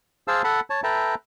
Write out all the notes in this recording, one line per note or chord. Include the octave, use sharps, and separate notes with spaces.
G#4 C5 F5 A5 E6
A4 F#5 A5 B5
C#5 A5
A4 B4 E5 G5 A5 A#5